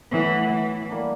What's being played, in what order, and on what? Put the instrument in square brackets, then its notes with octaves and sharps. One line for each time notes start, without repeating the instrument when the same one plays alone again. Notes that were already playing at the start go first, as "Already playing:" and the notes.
[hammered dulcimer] A2 F#3 B3 [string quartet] E3
[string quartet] E3
[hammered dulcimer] G3 A#3 D4